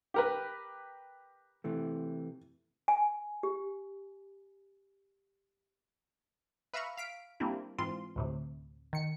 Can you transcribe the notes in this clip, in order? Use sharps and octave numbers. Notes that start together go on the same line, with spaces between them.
G4 A#4 B4
C3 E3 A3
G#5
G4
B4 E5 F5 A#5 B5 C#6
F5 B6 D7
G3 A#3 C4 D4 E4
G#2 E3 C4 F4 C6
D2 A2 C3
D#3 C#7